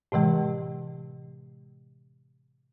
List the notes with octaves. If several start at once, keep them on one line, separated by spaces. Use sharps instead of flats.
A2 C3 E3 G#3